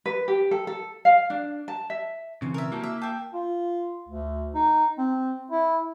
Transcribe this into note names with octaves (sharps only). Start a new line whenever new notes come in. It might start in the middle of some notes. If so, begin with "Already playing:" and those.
B4
G4
A4
A4
F5
D4
A5
E5
B1 C#3 E3 C4
A#4 E5
A#3 E4 F#4 A5
E5
E5 G5 A5
F4
D2
D#4
C4
E4